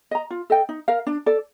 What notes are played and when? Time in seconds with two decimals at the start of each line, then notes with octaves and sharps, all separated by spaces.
0.11 D#5 A#5
0.30 F4
0.50 A4 D#5 G5
0.69 D#4
0.88 A#4 F5
1.07 D4
1.26 A4 D5